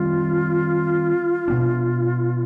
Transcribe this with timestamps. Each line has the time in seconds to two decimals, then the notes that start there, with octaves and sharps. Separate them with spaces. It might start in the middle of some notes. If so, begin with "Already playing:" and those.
Already playing: D#3 G3 C4 F4
1.48 B2 B3 D4